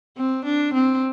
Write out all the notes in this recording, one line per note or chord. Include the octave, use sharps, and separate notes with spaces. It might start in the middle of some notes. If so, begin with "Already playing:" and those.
C4
D4
C4